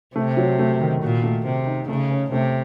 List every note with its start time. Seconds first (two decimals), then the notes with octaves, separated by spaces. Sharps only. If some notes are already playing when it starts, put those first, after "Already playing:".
0.16 C3 A3
0.37 F#3
0.59 A3
0.81 D#3
1.02 A#2 F#4
1.23 A3
1.45 C3 A3
1.67 D#4
1.88 C#3 A3
2.11 C#4
2.31 C3 A3